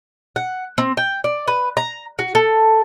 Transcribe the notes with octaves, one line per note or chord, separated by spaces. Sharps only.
F#5
C4
G5
D5
B4
A#5
F#4
A4